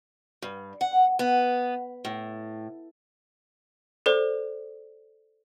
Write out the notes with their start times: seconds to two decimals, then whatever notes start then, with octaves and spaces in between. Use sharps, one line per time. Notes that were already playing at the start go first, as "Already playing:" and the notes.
0.42 G2
0.81 F#5
1.19 B3
2.05 A2
4.06 A4 C5 D5